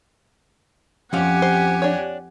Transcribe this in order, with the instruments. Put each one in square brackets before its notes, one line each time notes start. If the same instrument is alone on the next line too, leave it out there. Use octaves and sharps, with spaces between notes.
[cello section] F2 G4 [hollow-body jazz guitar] F3 C#4 F5 [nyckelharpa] F#5 G#5
[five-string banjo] C5
D4 C#5